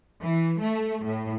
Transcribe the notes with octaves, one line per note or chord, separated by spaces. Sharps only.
E3
A3
A2